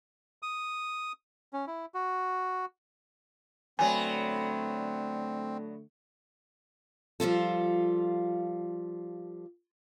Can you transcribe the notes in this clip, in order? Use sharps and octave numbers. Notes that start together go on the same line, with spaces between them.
D#6
C#4
E4
F#4
D3 F#3 A3 B3 C4 G#5
F3 G3 F4 A4